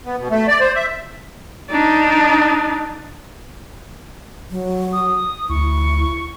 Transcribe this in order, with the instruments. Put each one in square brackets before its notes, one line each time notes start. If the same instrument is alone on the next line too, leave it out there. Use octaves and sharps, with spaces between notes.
[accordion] B3
B2
A3
D5
C5
E5
[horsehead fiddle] D4 D#4
[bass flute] F#3
[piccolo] D#6
[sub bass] D2 [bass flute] E4 [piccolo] C#6